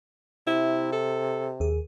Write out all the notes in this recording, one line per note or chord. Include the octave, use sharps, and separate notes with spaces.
C3 E4
A4
D#2 G#4